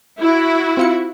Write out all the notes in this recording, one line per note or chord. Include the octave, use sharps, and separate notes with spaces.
E4 F#4
C4 F4 C#7